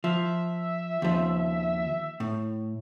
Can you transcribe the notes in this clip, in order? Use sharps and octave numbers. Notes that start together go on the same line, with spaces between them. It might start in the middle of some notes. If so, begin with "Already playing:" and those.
F3 E5
D#2 F3
A2